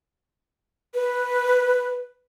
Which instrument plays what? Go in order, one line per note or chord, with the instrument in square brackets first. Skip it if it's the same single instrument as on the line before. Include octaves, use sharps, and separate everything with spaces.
[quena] B4